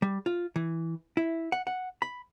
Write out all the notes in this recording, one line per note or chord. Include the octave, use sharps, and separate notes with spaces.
G3
F4
E3
E4
F#5
F#5
B5